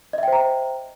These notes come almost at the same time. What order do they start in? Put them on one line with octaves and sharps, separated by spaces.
D#5 E5 G5 C5 A#5